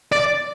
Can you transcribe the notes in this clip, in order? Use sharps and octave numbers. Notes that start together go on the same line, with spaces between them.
D5